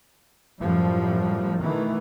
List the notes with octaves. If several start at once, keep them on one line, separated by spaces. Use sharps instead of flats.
F#2 A2 F3 G3
B2 D#3 E3 A3